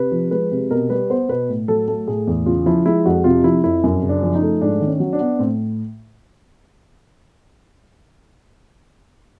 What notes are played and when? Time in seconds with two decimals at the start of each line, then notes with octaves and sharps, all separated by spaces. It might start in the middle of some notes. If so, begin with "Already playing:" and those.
Already playing: C3 B4
0.12 F3
0.31 G#3 B4
0.51 C3
0.71 B2 A#4
0.90 G3 B4
1.10 B3 C5
1.29 B2 B4
1.49 A2
1.68 F#3 A4
1.88 A3 A4
2.07 A2 G#4
2.27 E2
2.46 C#3 F4
2.66 F3 E4
2.86 G#3 E4
3.05 F2 F#4
3.24 C3 F4
3.44 F3 E4
3.64 F2 E4
3.84 F#2
4.03 C#3
4.09 D4
4.23 F3
4.35 D#4
4.42 A3
4.61 G#2 D4
4.81 D#3
4.87 C#4
5.00 F#3
5.13 D4
5.20 B3
5.39 A2 C4